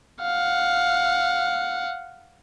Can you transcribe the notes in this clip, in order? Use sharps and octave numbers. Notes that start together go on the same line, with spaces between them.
F5 F#5